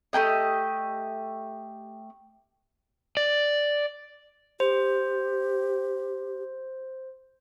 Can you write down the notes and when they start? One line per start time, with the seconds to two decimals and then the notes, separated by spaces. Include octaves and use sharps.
0.13 A3 A#3 G4 D#5
3.17 D5
4.60 G4 C5